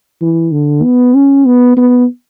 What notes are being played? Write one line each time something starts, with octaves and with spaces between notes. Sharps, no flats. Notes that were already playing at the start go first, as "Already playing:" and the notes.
E3
D3
B3
C#4
B3
B3